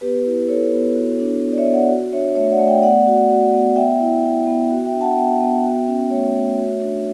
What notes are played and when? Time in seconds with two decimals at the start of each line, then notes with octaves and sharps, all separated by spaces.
0.01 B3 G4 B4
0.26 E4
0.48 E4 A4 C#5
0.72 B3
0.95 F#4
1.19 D4
1.42 B3
1.52 D5
1.58 C#5 E5
1.66 B3
1.73 D5 F#5
1.89 F#4
2.12 D4 C#5 E5
2.35 A3 C#5 E5
2.51 D5 F#5
2.59 A3
2.67 E5 G5
2.82 B3 D5 F#5
3.07 F#4
3.30 F#4
3.53 B3
3.76 B3 E5 G5
4.00 E4
4.24 E4
4.47 B3
4.71 F#4
4.86 E5 G5
4.94 D4
5.01 F#5 A5
5.17 B3 E5 G5
5.41 B3
5.64 F#4
5.87 C#4
6.10 A3 C#5 E5
6.35 A3
6.57 F#4
6.81 D4